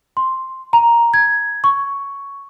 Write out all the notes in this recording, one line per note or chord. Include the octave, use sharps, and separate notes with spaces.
C6
A#5
G#6
C#6